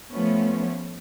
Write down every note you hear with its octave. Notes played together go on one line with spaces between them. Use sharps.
F3 A3 B3 C#4